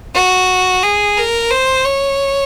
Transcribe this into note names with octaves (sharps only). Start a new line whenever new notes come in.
F#4
G#4
A#4
C5
C#5